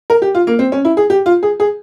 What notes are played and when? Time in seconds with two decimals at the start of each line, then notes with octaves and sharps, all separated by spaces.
0.10 A#4
0.22 G4
0.35 F4
0.47 A#3
0.59 C4
0.72 C#4
0.85 E4
0.97 G#4
1.10 G4
1.26 F4
1.43 G#4
1.60 G#4